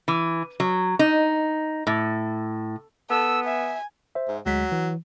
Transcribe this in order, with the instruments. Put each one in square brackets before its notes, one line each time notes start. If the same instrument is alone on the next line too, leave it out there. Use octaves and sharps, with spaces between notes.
[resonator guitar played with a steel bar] E3
F#3
D#4
A2
[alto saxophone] B3 [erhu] A4 [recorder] E6
[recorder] E5 [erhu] G#5
[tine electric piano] C5 E5
[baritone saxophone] G#2
[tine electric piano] D2 G#3 B6 [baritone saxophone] F#3
[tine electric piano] E3